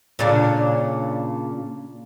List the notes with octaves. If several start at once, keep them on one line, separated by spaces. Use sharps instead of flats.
A#2 C#3 D4